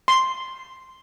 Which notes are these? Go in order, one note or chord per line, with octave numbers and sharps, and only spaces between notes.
C6